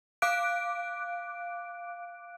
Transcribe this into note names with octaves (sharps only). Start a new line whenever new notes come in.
F5 D6 F#6 D7